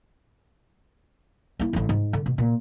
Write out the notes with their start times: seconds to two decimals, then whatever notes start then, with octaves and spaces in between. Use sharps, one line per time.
1.59 A#3 E4
1.73 A1 D2
1.89 G#2
2.13 D3
2.26 B2
2.38 A#2